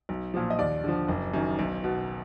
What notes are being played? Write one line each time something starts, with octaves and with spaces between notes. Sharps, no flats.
B1
A#2 F3
D#5
D#2 D5
D3 F3
F#1
F#2 D#3
B1
B2